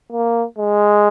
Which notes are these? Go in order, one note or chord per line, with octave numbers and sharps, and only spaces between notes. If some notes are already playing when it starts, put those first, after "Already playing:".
A#3
G#3